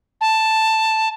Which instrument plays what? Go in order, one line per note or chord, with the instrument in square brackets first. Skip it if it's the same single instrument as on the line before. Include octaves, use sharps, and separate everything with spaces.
[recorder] A5